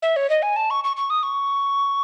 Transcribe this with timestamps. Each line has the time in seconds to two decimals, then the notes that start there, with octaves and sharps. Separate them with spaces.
0.02 E5
0.16 C#5
0.30 D#5
0.42 G#5
0.56 A5
0.70 C#6
0.84 C#6
0.97 C#6
1.10 D#6
1.23 C#6